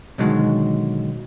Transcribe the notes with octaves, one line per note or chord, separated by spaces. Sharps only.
B2 D3 D#3 F#3 G#3